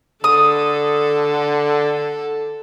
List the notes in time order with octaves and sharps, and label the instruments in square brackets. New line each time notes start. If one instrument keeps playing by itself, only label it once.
[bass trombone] D3 [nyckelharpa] A4 [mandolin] D#6